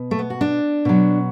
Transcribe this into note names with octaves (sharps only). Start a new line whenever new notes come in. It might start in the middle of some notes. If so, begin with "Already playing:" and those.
Already playing: B2
A3
B3
F#4
D4
B2 F#3